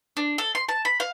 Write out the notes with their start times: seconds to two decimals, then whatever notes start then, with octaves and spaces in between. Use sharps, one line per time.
0.17 D4
0.38 A4
0.55 C6
0.69 A5
0.85 B5
1.00 F5